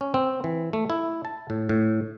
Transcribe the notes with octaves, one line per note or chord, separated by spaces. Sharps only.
C#4
C4
E3
A3
E4
A5
A2
A2